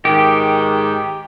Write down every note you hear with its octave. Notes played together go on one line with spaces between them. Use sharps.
G#2 D#3 G4